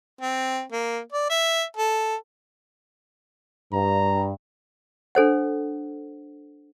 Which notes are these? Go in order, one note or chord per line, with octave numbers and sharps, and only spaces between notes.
C4
A#3
D5
E5
A4
G2 A#5
D4 A4 C5 F#5